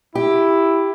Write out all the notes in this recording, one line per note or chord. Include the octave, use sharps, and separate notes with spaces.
E4 G4